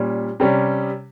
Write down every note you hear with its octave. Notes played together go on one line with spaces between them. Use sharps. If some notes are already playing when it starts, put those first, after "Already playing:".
Already playing: A#2 G3 C#4
C3 G3 C#4